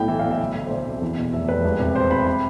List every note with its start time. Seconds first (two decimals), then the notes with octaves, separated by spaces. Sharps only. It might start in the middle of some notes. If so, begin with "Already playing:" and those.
Already playing: B1 A2 G5
0.08 E3 E5
0.19 B1 F5
0.31 E5
0.40 D2
0.55 D2
0.67 C5
0.70 D2 D5
0.86 C3
1.02 E2
1.17 B2
1.33 F1 E5
1.48 F1 B4
1.64 E1
1.80 C3
1.95 C3 C5
2.11 C3 B5
2.26 B5